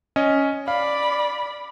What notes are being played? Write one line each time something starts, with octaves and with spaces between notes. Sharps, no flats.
C#4 D#5
D5 F5 B5